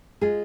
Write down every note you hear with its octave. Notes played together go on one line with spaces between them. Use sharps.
G#3 F4 G#4